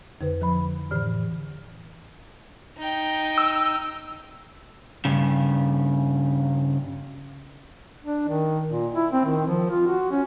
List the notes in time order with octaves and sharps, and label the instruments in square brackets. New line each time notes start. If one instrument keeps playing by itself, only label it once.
[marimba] F2 D3 B4
F3 B5
A2 D3 E3 F6
[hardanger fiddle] D#4 G5
[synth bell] E6
[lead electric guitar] G2 C#3
[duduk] D4
D#3
A#2
E4
C4
D#3
F3
F4
F#4
C#4